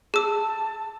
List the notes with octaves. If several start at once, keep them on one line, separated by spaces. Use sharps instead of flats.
G#4 A5 E6